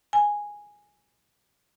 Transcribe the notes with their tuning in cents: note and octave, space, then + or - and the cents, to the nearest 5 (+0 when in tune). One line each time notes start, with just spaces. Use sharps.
G#5 -5